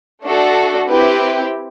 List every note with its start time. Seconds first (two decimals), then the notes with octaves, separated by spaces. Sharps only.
0.23 A3 D4 F#4 A4
0.89 C4 E4 G4 B4